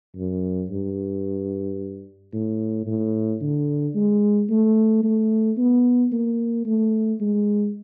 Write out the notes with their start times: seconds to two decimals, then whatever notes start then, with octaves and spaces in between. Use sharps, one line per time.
0.16 F#2
0.70 G2
2.33 A2
2.87 A2
3.41 D3
3.95 G#3
4.50 A3
5.03 A3
5.58 B3
6.12 A#3
6.66 A3
7.20 G#3